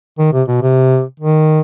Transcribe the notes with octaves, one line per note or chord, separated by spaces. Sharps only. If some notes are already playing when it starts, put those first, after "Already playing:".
D#3
C3
B2
C3
D#3